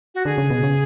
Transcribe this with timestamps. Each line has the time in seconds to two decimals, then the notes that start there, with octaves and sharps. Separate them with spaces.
0.15 F#4
0.25 D3 G#4
0.38 C#3
0.50 B2
0.63 C#3